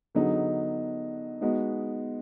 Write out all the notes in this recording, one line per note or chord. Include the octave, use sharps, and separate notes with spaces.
D3 F#3 B3 D#4 G#4
G#3 B3 D#4 F#4